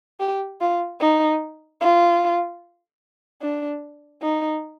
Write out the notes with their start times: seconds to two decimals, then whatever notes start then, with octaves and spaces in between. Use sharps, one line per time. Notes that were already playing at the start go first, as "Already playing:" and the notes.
0.20 G4
0.61 F4
1.00 D#4
1.81 F4
3.42 D4
4.22 D#4